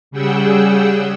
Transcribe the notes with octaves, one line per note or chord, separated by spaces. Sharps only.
C#3 G3 G#4 F#5 G5 E6